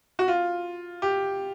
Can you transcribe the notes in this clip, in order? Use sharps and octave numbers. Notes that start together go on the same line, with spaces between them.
F#4
F4
G4